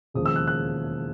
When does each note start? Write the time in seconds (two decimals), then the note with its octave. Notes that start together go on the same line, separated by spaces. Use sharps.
0.14 E1 D#2 C#3 F3 D#6
0.26 E6
0.36 F#6
0.47 F#6